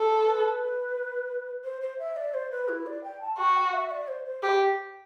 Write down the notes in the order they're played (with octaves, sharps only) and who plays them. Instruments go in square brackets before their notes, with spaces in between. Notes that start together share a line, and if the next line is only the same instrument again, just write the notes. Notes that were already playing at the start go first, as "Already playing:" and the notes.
Already playing: [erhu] A4
[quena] B4
C5
C5
E5
D5
C5
B4
E4
D5
G5
A5
[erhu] F#4 [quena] G5
[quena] F#5
E5
D5
C5
C5
[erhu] G4